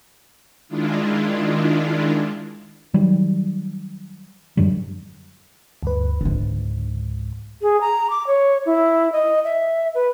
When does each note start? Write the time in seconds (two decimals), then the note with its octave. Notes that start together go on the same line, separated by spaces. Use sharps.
0.68 D#3 G#3 D4 E4 F4
2.94 D#3 F#3 G3
4.57 F#2 D3 F#3 G3
5.83 D2 G2 B4
6.21 C#2 G#2 D3
7.62 G#4
7.81 A#5
8.10 D6
8.27 C#5
8.66 E4
9.12 D#5
9.45 E5
9.95 B4